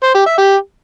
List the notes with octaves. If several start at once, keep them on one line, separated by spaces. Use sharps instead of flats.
C5
G4
E5
G4